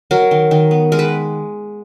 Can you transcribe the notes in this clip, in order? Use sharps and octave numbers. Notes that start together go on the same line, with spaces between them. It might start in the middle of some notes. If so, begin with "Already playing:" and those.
F#3 A#4
D#3
D#3
B3
G#3 A#4
B4